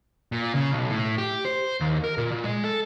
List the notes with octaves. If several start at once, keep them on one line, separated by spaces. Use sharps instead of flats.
A#2
C#3
B1
A2
G4
C5
D#2
A#4
A#2
A#2
G#3
A4